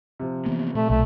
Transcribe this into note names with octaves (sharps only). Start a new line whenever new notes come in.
C3 F3
E3 A#3 B3
A#2 A3
B1 A3